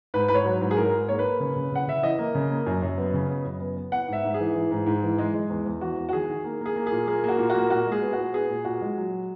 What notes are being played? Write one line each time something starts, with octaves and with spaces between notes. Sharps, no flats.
G#2 B4
G#2 B4
C#5
F#3
G#2
G#4
G#2 A#4
G#2
A#3 C#5
B4
A#3
C#3
C#3
C#3 F#5
C#3 E5
E3 D#5
A#3
C#3
A#3
F#2
F#2
B3
C#3
B3
F#2
B3
B3
B3 F#5
G#2 E5
G#2
G#4
E3
E3
G#2
G#2
E3
G#3
G#3
E2
E2
E2 F#4
E2
F#4
D#3 G#4
D#3
A#3
A#3 G#4
A#3
G#4
A#2
A#3 G#4
A#3 F#4
A#2
A#3 F#4
A#2 F#4
G#3
G#4
B3
A#2 F#4
B3 G#4
A#2
A#2 F#4
G#3
F#3